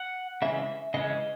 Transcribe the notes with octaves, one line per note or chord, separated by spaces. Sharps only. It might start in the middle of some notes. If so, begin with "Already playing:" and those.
Already playing: F#5
C#3 E3 G#3 C#4 E5
C#3 E3 G#3 C#4 D#5